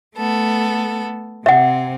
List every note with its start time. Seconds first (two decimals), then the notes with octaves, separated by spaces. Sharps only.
0.16 A3 B3 A4
1.46 C3 C4 E5 F#5